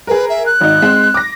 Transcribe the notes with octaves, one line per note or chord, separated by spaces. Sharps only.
G#4 A#4 B4
E5
F#6
G#1 D#4
G#3 C4
D6 A#6